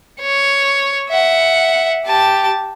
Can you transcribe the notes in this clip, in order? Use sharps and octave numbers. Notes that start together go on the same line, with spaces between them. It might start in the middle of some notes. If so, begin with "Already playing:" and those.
C#5
E5 F#5
G4 A5